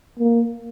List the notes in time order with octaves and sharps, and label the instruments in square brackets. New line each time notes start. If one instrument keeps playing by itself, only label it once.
[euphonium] A#3